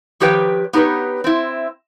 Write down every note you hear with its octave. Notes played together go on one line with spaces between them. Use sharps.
D#3 F3 G4 B4 C#5 G5
B3 D#4 G4 B4 C#5
C4 E4